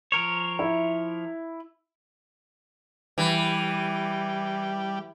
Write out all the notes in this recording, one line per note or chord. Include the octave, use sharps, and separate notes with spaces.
F3 A#4 C#5
E4 E5
E3 G3